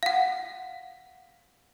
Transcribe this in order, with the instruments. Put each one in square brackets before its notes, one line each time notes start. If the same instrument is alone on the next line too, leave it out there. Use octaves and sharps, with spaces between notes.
[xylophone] F5 F#5